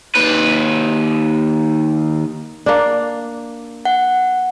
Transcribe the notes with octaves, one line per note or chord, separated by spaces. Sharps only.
D#2 B4
A#3 D4
F#5